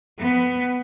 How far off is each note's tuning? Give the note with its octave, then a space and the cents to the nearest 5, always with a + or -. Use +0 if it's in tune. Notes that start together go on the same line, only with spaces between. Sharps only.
B3 +15